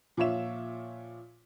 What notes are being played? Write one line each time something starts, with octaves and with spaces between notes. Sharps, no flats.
A#2 F3 F4 C#5 E5 E7